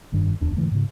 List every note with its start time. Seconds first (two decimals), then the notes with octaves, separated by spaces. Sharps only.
0.12 F1 G2 D#3 D4
0.41 D1 E2 D4
0.57 G#2 D3 E3 A3
0.71 G#2 C#3